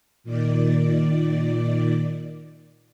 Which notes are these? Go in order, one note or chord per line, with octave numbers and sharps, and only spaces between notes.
A#2 D#3 D5